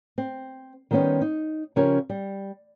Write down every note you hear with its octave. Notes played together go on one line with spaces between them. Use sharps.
C4
D#3 G3 B3 C#4 C5
D#4
C#3 F3 C#4 G4 A#4 C#5
G3